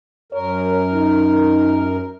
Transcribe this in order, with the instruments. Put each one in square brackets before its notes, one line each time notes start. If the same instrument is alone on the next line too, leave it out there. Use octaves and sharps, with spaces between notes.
[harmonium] F#2 A#4 [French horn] C#5
[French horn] D#4